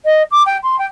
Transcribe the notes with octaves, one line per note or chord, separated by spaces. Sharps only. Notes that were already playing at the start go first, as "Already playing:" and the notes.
D#5
D6
G5
C6
G5